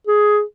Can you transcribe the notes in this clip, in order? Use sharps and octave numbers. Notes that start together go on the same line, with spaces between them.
G#4